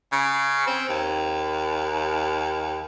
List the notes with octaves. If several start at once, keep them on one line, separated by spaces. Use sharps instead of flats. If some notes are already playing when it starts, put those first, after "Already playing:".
C#3
C4
D#2